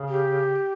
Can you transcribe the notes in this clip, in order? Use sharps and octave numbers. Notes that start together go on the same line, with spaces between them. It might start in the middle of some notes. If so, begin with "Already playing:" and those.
Already playing: C#3
G4